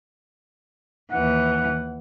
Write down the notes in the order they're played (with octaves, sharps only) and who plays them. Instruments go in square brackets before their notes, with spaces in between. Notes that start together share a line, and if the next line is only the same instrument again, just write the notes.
[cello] D#2 E3 [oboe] F#5